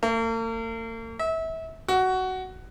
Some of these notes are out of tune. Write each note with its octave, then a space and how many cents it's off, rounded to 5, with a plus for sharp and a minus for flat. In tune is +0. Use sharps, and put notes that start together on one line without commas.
A#3 -45
E5 -30
F#4 +10